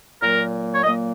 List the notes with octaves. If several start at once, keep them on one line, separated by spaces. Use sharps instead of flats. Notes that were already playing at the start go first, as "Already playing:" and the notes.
A#2 F#3 A#3 A#4
C#5
A#2 F#3 A#3 D#5